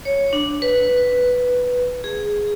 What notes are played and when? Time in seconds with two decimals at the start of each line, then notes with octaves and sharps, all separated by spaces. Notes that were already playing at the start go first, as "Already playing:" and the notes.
0.05 C#5
0.33 D4
0.62 B4
2.04 G#4